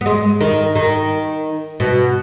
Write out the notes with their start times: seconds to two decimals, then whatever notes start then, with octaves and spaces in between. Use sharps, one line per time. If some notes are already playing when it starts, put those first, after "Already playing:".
0.01 B3
0.06 G#3
0.41 D#3
0.76 D#3
1.80 B2